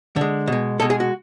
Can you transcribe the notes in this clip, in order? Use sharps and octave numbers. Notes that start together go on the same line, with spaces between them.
D3 G#3
B2 G#3
B2 G#3 A4
G#4
F#4